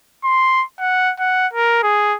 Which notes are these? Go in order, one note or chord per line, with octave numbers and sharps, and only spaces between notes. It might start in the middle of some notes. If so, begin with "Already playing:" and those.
C6
F#5
F#5
A#4
G#4